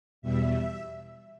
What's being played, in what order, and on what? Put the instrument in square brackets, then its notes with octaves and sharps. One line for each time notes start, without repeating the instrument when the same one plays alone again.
[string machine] E2 B2 G3 E5